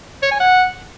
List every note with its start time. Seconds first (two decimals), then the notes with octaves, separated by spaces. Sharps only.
0.22 C#5
0.31 G#5
0.40 F#5